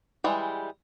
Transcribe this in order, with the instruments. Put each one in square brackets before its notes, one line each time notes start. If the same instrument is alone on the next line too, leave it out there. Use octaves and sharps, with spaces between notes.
[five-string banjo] E3 G3 G#3